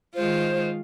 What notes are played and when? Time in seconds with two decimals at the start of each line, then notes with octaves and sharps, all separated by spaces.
0.14 D#3 G#3 F4 C5